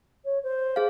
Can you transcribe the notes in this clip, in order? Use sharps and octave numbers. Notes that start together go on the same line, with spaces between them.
C#5
C5
G#4 F5